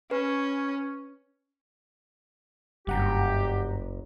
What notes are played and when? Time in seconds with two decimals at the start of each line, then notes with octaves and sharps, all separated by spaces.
0.11 C#4 B4
2.87 F#1 G2 G4 F#5 A#5